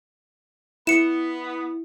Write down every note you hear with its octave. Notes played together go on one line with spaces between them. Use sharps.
B3 E4 C#7 E7